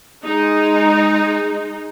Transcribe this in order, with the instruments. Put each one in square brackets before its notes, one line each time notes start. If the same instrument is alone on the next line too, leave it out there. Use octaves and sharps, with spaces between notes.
[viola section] G#3 D#4